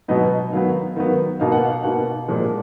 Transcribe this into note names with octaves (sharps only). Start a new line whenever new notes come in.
B2 F#3 B3 D#4 D#5
D#3 F#3 B3 F5
D#3 F#3 B3
B2 A#3 D#4 F5
F#5
F5
B2 A#3 D#4 F#5
A#2 F3 G#3